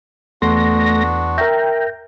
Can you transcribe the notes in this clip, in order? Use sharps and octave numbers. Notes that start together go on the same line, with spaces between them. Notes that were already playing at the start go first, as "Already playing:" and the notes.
E2 A3 B3 D4 F#4 C6 A#6
A#4 E5 G5 A#5